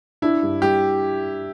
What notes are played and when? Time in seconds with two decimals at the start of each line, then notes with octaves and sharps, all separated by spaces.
0.22 D4 E4
0.42 G2
0.62 G3 G4